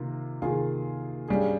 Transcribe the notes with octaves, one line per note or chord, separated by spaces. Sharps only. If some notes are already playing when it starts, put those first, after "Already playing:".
Already playing: C3 D#3 A#3 F4
C3 D#3 A#3 F4 G#4
G2 G3 C#4 G#4